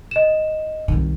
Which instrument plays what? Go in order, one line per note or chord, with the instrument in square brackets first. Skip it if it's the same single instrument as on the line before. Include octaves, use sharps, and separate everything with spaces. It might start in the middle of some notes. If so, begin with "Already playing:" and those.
[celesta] D#5 E7
[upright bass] C2 D#3